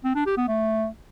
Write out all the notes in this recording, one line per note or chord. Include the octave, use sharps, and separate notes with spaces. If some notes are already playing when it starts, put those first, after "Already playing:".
C4
D4
G4
B3
A3